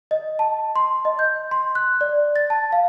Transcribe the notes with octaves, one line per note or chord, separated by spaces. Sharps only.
D#5
A5
C6
D#5
G6
C6
F#6
D5
A6
A5
F5